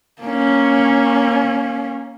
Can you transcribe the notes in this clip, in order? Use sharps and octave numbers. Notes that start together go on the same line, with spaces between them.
A#3 C#4